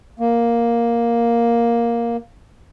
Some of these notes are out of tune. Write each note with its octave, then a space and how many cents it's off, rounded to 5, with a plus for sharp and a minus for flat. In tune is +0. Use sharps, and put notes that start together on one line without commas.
A#3 +5